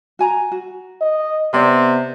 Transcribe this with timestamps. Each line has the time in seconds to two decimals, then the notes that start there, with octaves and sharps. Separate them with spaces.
0.19 F#4 G#5 A#5
0.51 F#4
1.01 D#5
1.53 C3 B3 C#5 D5 G5